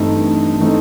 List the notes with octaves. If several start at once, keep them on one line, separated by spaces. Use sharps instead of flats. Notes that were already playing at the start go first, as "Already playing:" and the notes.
Already playing: G2 E3 A3 C4 D#4
E3 A3 C4 D#4